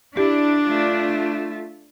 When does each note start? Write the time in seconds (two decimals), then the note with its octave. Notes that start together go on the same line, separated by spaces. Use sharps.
0.17 D4 E4 G4
0.65 A3 F4